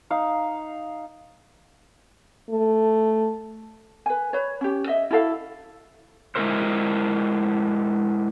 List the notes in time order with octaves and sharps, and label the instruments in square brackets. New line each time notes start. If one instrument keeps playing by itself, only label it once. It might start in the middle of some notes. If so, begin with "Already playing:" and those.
[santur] D#4 F5
[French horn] A3
[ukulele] B4 G#5
B4 C#5
C#4 G4
D#5 E5
E4 F#4 A4 F5
[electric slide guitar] G#3 E4 A#4 C5